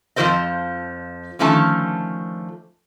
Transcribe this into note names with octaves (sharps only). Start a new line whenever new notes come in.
F2 F3 A3 A#4 C5 D#5
D3 D#3 F3 A3 C#4 A5